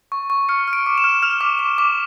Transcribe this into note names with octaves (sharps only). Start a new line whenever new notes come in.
C#6
C#6
F6 C#7
F6
D7
D6
E7
F6
F6 F7
D6
D6
D6